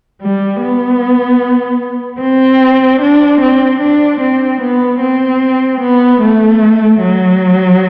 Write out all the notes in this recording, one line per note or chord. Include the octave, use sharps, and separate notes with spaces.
G3
B3
C4
D4
C4
D4
C4
B3
C4
B3
A3
F#3